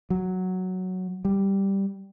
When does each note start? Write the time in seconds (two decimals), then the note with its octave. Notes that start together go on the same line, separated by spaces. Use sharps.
0.10 F#3
1.25 G3